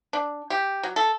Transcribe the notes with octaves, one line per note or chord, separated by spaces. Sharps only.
D4
G4
F#3
A4